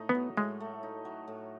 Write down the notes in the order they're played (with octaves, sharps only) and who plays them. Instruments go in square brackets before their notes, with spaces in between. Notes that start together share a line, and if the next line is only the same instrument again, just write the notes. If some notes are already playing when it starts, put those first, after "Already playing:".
Already playing: [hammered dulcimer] A2 A3 D#4
[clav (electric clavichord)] B3
[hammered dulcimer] F#3
[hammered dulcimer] A2 [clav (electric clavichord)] G#3
[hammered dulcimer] A3
D#4
F#3
A2